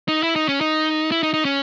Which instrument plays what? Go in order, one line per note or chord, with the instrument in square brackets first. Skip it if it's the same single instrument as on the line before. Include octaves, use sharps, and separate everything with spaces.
[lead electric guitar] D#4
E4
D#4
C#4
D#4
E4
D#4
D#4
C#4